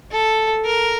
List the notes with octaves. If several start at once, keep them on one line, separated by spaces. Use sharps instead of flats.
A4
A#4